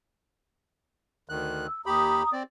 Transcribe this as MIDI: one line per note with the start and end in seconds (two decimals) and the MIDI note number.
1.29 1.67 38
1.29 1.67 51
1.29 1.67 90
1.68 1.81 88
1.86 2.23 39
1.86 2.23 67
1.86 2.30 82
1.86 2.23 83
1.86 2.30 87
2.33 2.43 60
2.33 2.43 74